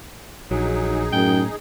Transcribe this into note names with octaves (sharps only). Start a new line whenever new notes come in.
A#1 F#3 D#4 G#4
F#2 A2 G5